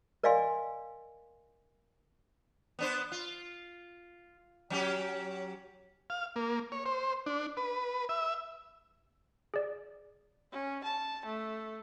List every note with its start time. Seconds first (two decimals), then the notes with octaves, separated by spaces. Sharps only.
0.23 A#4 D5 D#5 F5 G#5 C6
2.79 B3 D4 C5
3.12 F4
4.70 F#3 C#4 G4
6.10 F5
6.36 A#3
6.72 C#5
6.86 C5
7.26 D4
7.57 B4
8.09 E5
9.54 G#4 D5
10.52 C#4
10.84 A5
11.25 A3